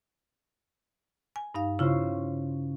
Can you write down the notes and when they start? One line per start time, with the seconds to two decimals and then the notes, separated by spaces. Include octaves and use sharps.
1.36 G#5
1.55 G2 D#4 F5
1.79 C#3 C#4 E4 F4 C5